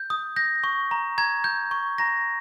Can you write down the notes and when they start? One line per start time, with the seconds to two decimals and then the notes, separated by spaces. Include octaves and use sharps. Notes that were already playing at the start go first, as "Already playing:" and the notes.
Already playing: G6
0.10 D#6
0.36 G6 A#6
0.64 C#6
0.91 A#5
1.18 A#5 G#6
1.44 G6
1.71 C#6
1.98 A#5 A#6